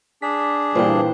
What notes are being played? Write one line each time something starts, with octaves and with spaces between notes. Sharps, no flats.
D4 G#4 B6
G2 A#2 E3 C5 D5 G5